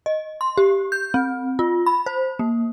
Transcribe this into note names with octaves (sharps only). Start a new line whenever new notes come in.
D#5
C6
G4
G6
C4
F4
B5
C5
A#3